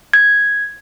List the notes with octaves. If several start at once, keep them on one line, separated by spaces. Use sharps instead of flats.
G#6